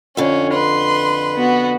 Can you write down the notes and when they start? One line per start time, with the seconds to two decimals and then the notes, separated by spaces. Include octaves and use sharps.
0.17 F2 D3 C#4
0.53 B4 C6
1.36 B3 F#4